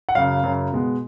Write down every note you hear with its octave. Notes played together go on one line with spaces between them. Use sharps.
F#5
F#2 C#3 F#3 F5
F#2 C#3 F#3
B2 G#3 B3